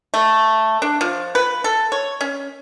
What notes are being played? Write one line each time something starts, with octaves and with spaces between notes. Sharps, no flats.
A3
D4
F3
B4
A4
C#5
C#4